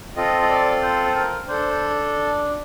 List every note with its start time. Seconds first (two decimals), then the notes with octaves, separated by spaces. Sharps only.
0.16 C4 F4 A4 D#5
0.42 D#5
0.49 D5
0.82 C5
1.06 C5
1.15 A#4
1.48 D4 A4 C5